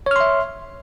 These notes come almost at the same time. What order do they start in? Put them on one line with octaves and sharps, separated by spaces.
C#5 F6 C6 E5